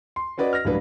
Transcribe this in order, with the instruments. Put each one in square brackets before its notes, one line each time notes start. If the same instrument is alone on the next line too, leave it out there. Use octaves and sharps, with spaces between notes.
[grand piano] C6
C#4 F#4 B4 D5 D#5
F6 A#6
C#2 A2 F#3 G3 D4 B4